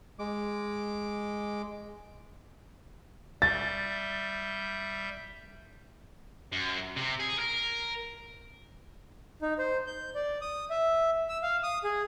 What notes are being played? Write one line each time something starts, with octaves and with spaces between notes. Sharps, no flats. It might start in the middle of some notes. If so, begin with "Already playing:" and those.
G#3 D6
G3 E5 G6 A6
F#2
C3
G#4
A#4
D#4
C5
G6
D5
D#6
E5
E6
F5
D#6
G#4